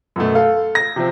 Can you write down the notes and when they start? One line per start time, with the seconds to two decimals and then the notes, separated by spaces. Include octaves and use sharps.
0.16 F#2 B2 A3
0.35 A4 F5
0.75 A#6
0.96 C3 F3 C4